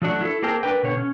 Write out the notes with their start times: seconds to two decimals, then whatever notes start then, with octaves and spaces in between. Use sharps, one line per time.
0.02 F3 F#3 A3 D4 F#4
0.21 E4 A4
0.43 A#3 C4 G#4 A#4 G5 A5
0.63 D4 A#4 B4 G5
0.83 B2 D3 C#5
0.97 C#4